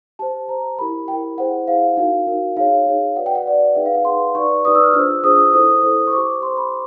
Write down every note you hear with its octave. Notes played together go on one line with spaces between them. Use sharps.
G4 C5 A5
G4 C5 A#5
E4 G4 A#4 B5
E4 G4 A#4 G5
E4 G#4 C5 F#5
E4 G#4 C5 F5
D#4 F#4 A#4 F5
D#4 F#4 A#4
D#4 G#4 C#5 F5
D#4 G#4 C#5
F#4 B4 D5 F#5
G5
F#5
F#4 B4 D5
D#4 G#4 B4 E5
F5
F#5
D#4 G#4 B4 C6
D#4 G4 B4 D5 C#6
D#4 G4 B4 D5 D#6
E6
F6
D4 F4 G#4 C5 E6
D4 F4 G#4 C5 D#6
E4 A4 C5 D#6
E4 A4 C5
C#6
G4 C5 D6
G4 C5 C6
B5